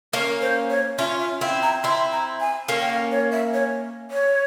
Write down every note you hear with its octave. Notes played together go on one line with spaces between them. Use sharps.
A#3 C#4 A#4
C5
C#5
C#4 F4 E5
E5
C4 E4 F5
A#5
C4 E4 C6
A#5
G#5
A#3 C#4
G5
F5
C#5
E5
C#5
C#5